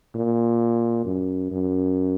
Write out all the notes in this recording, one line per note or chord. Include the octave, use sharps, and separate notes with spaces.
A#2
F#2
F#2